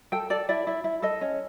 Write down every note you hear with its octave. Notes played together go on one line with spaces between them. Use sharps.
A4 G5
A4 D5
E4 D5
E4
E4
A4 D#5
C#4